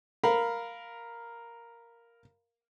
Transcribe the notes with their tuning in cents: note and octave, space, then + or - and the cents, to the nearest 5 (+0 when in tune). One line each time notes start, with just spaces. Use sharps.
A#4 +0 F5 +0 B5 +5